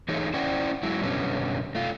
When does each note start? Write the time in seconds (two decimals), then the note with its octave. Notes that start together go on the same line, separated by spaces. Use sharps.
0.08 E3 A3 D#4 G#4 C#5
0.34 C#4 E4 C5 D5 F#5 G5
0.83 F#3 G#3 E4
1.02 F#2 B2 D3 G3 B3 C#4
1.75 A3 F4